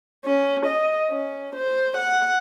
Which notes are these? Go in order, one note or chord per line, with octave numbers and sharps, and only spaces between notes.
C#4
D#5
C#4
C5
F#5